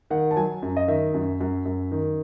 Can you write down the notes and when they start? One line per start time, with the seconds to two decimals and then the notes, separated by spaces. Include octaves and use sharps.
0.10 D#3 F#5
0.31 A5
0.36 F#3 G#5
0.62 F#2
0.77 D#5
0.88 D#3 E5
1.14 F#2
1.41 F#2
1.65 F#2
1.92 D#3